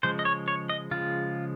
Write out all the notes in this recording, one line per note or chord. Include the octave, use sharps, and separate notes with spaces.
C#3 F3 G#3 C5
D#5
C#5
C#5
D#5
C#3 F3 G#3 F4